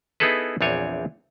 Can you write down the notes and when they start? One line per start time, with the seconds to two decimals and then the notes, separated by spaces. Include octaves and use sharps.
0.20 B3 D#4 E4 G#4 A4 B4
0.61 A#1 E2 C4 D4 C#5 G#5